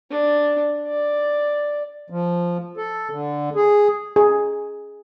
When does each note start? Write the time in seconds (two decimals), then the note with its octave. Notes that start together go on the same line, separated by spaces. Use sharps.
0.11 D4
0.87 D5
2.10 F3
2.77 A4
3.10 D3
3.56 G#4
4.16 G#4